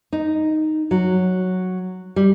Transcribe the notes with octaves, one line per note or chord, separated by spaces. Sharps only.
D#4
F#3
G3